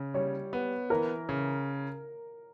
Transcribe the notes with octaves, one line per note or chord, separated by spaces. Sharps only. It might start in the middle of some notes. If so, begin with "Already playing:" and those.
Already playing: C#3
G3 C#5
B3
E3 A#4
C#3